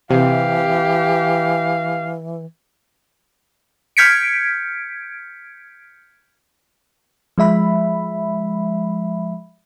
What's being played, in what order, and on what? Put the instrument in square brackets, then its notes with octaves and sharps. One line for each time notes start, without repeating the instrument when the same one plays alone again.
[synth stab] C3 [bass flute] E3 [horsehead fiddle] G4 [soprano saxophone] F5
[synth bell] F6 G6 G#6 B6 C#7 D7
[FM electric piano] F3 G#3 E5 B5